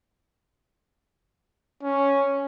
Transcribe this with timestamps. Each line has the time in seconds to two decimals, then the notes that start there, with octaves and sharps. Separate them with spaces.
1.83 C#4